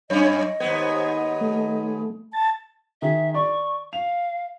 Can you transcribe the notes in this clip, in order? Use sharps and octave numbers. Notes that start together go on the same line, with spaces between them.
F#2 C#4 C#5 D#5
D#2 G#2 B3 C5 G#6
A3
A5 A6
D#3 G#4 E5
D5 C#6
F5 F7